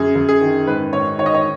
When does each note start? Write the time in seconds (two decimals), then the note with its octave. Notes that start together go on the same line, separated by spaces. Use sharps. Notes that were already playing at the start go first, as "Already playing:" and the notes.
Already playing: F#2 G#4
0.15 F#2
0.29 G#4
0.41 D#3
0.67 G#2 B4
0.93 G#2 C#5
1.18 D#3 C#5
1.26 D#5
1.34 C#5